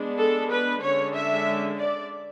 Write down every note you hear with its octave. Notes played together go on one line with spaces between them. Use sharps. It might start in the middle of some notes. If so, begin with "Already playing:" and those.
Already playing: G#3 B3 D4
A4
B4
D3 G#3 C#4 C#5
E5
D5